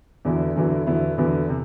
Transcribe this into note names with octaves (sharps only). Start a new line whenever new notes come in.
E2 D3 F#3 B3 E4
E2 D3 F#3 B3 E4
E2 D3 F#3 B3 E4
E2 D3 F#3 B3 E4
C3